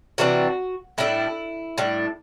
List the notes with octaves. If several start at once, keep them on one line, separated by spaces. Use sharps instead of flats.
C3 E3 G3 D4 F#4
A2 G3 D4 E4
A2 G3 D4